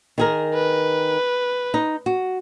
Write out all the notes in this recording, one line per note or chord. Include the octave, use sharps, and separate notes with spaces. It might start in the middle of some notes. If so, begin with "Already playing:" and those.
D#3 G#4 A#4
B4
D#4
F#4